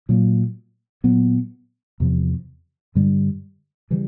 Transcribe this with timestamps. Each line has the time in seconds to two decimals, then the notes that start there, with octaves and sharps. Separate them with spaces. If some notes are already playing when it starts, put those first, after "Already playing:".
0.09 A#2 F#3 A#3
1.04 A#2 F#3 B3
2.00 E2 C3 F3
2.95 G2 D3 G3
3.90 C#3 E3 G3